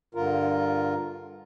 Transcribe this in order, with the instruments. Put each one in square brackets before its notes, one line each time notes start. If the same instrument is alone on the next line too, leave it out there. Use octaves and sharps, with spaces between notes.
[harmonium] G2 D3 F4 A#4